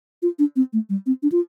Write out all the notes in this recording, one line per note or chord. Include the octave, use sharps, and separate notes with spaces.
F4
D4
C4
A3
G3
C4
D4
F4